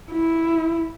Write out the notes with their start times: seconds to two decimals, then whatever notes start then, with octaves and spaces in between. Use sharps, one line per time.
0.11 E4